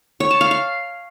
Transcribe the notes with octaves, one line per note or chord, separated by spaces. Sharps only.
C#5
A5
F5
F5